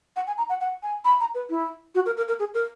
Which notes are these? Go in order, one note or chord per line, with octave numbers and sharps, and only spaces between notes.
F#5
G#5
A#5
F#5
F#5
G#5
B5
A#5
B4
E4
F#4
A#4
A#4
A#4
G#4
A#4